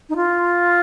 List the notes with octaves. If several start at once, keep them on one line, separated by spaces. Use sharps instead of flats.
D#4
F4